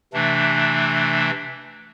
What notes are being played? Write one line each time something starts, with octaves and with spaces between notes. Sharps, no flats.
C3 E3 A3 D4